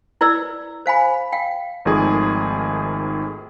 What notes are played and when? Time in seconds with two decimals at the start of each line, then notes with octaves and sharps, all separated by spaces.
0.21 E4 B4 D5 E6
0.86 C5 F5 G#5 B5
1.33 F5 G5
1.85 G#1 D#3 F3 A3 G#4